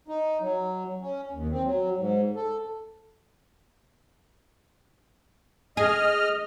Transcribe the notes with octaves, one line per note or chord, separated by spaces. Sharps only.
D#4
F#3
C#4
D#2
C4
F#3
G#2
A4
G#4 D#5 F6